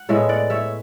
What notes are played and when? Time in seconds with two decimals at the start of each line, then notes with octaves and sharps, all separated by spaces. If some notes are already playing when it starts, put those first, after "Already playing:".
Already playing: F#5
0.09 A2 G#3 B3 C#5 E5
0.29 D5 F#5
0.50 C#5 E5